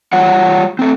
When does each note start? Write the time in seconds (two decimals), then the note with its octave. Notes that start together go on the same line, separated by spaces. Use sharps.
0.13 G3 F4 C#5 F#5
0.79 A3 C4